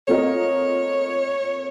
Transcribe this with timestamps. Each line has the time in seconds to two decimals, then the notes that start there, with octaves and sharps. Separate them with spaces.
0.08 A3 C4 F4 A#4 C#5 D#5